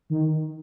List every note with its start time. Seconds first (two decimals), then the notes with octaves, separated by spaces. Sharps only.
0.10 D#3